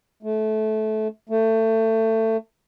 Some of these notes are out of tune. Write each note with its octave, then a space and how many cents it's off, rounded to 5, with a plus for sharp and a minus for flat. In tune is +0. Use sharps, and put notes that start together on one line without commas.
A3 -20
A3 +25